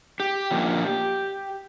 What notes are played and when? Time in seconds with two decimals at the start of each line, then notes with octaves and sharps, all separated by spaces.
0.20 G4
0.51 A#2 F3 A#3